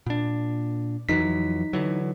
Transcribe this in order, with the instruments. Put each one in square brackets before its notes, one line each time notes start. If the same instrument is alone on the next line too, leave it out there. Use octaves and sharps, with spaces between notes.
[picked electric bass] A#2 D4
[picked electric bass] F2 E3 F#3 [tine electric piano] D#4 B6
[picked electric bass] D3 E3 F#3